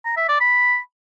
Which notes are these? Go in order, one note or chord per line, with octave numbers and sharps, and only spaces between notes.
A#5
E5
D5
B5